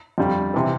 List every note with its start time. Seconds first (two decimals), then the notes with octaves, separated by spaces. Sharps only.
0.18 F2 D3 G3
0.54 C3 E3